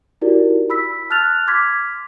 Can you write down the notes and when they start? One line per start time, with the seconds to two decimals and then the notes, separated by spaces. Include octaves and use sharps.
0.21 D#4 E4 F#4 G4 A#4 D5
0.70 B5 E6 B6
1.10 A5 F6 F#6 A6 F7
1.47 C6 D6 F6 G#6 B6